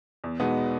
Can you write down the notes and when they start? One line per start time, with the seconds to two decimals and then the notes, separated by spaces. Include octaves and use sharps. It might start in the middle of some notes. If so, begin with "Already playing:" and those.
0.24 E2
0.39 B2 G#3 B3 D#4